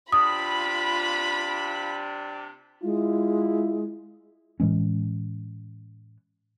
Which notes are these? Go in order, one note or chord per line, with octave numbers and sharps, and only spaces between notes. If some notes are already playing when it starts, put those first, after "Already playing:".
C3 D4 F4 B5 D#6
G#3 E4 F4
A2 E3 G#3 C#4